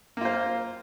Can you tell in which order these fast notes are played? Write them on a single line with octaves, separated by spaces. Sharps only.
A#3 F4 C5